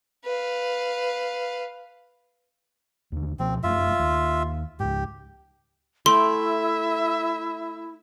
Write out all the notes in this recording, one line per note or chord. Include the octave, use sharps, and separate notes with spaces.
B4 F5
D#2 D3
C#2 B2 F3 C4
F1 F#2 A3 F4 E5
D#2
C#2 G#2 G4
A3 E4 E5 G5 C6